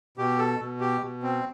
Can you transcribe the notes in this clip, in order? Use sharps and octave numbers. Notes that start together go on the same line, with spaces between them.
B2 G4
A4
B2
G4
B2
C4